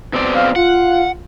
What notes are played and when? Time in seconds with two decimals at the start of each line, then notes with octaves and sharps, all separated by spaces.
0.13 B2 C4 D5
0.34 F5
0.56 F4 F#5